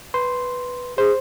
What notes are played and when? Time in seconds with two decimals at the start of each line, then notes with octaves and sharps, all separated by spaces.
0.14 B4 C6
0.98 G#4 C5